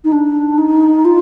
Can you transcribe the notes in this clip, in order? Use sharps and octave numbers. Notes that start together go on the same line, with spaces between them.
D#4
D4
D#4
F4